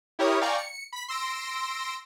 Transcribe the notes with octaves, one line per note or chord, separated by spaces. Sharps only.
E4 G4 A#4 C#5 D#6
D5 F5 G5 G#5 A#5 C#6
C#7
B5 B6
C6 E6 A#6 D7